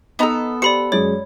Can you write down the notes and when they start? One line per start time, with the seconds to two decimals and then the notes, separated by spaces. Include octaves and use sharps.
0.19 B3 D#4 A4 D#5 A#5
0.62 G4 C5 D5 B5 C#7
0.92 F#2 G#3 C#5 D5